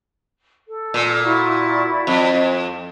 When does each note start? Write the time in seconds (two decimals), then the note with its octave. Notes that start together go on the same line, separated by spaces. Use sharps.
0.67 A4
0.94 A#2
1.23 E4 F#4 D5
2.07 F2